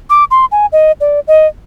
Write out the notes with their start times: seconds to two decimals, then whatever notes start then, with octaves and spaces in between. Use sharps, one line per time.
0.10 D6
0.31 C6
0.52 G#5
0.72 D#5
1.00 D5
1.28 D#5